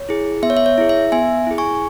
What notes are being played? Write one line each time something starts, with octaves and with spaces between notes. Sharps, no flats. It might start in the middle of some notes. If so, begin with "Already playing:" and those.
Already playing: C#5
E4 G#4
B3 E5
C#5
E5
C#5
E4 G#4
E5
B3 E5 G#5
E4 G#4
G#5 C#6